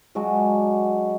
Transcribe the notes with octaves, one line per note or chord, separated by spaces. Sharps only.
F#3 G#3 D4 F#4